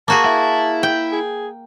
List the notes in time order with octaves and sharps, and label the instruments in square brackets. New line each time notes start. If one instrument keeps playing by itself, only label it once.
[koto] A#3 F#4 G#4 [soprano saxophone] A5
[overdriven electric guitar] E4
[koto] G5
[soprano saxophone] G#4